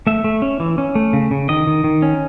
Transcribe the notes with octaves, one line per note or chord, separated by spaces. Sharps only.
A3 E5
A3
C#4
E3
C#4
A3
C#3
C#3
D#3 D#5
D#3
D#3
C#4